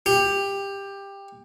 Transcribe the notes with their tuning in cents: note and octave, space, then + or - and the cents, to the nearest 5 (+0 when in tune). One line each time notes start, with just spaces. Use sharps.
G4 +15